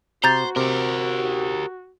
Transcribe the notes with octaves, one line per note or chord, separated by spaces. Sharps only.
C3 F#4 C5 A#5 G6 A6
C3 G4 A#4